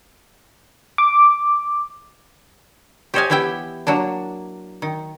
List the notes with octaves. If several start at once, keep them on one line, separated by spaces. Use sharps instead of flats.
D6
G4 C5 C#5 D#5 F5 G#5
E3 B3 E4 G4 G5
F#3 A#3 D4
D#3